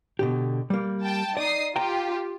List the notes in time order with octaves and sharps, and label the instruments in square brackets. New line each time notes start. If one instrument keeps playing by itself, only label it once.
[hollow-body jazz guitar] B2 D3 G4
G3 A#3
[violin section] G5 A5
[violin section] D#4 D#6 C7 [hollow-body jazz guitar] D5
[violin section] F4 G4 [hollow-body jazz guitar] G5 A#5